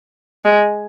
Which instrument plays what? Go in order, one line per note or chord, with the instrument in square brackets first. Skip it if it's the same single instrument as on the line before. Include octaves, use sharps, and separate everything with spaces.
[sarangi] G#3